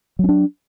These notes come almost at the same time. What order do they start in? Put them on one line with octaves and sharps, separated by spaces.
F#3 C#4 D4